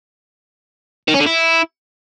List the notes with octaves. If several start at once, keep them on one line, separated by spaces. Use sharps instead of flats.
D#3
C#4
D3
E4